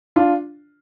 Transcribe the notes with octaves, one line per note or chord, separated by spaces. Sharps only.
D4 F4